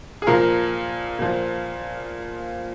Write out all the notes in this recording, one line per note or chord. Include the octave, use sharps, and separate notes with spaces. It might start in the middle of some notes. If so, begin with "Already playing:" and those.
G#4
A#2 F3 A#4
A#2 F3